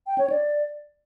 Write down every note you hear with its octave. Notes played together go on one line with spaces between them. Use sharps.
G5
C#5
D5